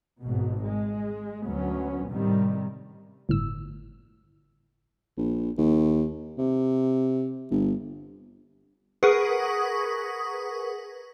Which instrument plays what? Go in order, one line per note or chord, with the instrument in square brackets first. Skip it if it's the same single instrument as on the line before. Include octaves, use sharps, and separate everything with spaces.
[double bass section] G#1 G#2 B2
G#3
D2 F#3 B3 C#4
A2 C3 D#3 G3
[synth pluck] G1 A2 E6
[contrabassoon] A#1
D#2
C3
G1
[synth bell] G#4 A#4 B4 F#5 C#6 D#6